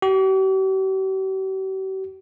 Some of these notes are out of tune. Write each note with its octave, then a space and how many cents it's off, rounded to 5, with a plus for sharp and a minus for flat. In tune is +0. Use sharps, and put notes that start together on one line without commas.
G4 -45